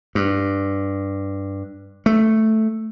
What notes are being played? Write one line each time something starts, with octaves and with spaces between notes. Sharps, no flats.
G2
A3